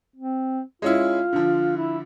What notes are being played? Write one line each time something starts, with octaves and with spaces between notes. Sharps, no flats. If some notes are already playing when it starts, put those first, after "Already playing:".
C4
G#3 C#4 E4 F4
D3 F3
E4